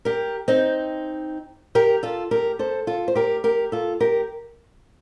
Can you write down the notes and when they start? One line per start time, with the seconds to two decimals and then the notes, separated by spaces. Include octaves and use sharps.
0.05 G4 A#4
0.48 C4 D#4
1.75 G4 A#4
2.03 F4 A4
2.31 G4 A#4
2.59 A4 C5
2.87 F4 A4
3.08 C5
3.15 G4 A#4
3.44 G4 A#4
3.72 F4 A4
4.00 G4 A#4